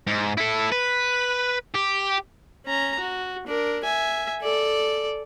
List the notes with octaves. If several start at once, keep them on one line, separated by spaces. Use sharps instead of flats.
G#2
E4 A4
B4
G4
C#4 A#5
F#4
D4 A#4
E5 G#5
A4 D5